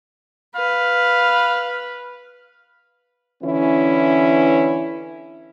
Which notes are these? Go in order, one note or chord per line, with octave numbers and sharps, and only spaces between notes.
B4 F5
D3 E3 C#4 E4